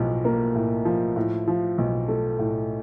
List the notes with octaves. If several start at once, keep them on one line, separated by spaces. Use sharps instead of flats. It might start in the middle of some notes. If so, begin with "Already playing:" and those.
Already playing: B1 A2 F3
A#3
A2
F3
A2
F3
B1
A3
A2